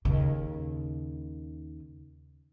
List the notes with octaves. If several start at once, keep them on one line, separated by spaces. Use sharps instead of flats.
D#2 C#3